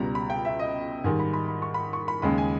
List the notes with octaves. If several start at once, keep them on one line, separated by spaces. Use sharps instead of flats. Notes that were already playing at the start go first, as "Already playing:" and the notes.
Already playing: C#2 B2 G3 A#5
B5
G5
E5
D#5
G#2 D#3 G3 G#5
B5
B5
B5
C#6
B5
C#6
B5
D#2 C#3 G#3 B5
G#5